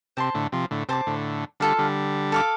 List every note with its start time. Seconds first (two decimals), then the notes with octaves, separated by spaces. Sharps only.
0.17 C3 C5 A5 C6
0.34 A2 D3
0.52 C3 F3
0.71 A2 D3
0.89 C3 C5 A5 D6
1.07 A2 D3
1.60 D3 G3 F4 A4 F5
1.79 D3 G3
2.32 A4 F5 D6